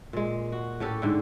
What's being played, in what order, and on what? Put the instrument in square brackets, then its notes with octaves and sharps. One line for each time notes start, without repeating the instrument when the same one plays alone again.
[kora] A#2 G#3
F#4
A2 C#4 G4 A4
G#2 D3